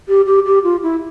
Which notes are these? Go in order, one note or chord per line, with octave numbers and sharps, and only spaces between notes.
G4
G4
G4
F4
E4